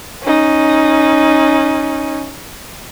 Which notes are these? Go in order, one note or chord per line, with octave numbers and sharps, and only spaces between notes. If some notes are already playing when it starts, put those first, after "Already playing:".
C#4 D#4